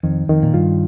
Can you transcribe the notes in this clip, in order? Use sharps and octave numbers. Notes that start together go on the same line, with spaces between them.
F2 D#3
F2 D#3
A#2
G2 F4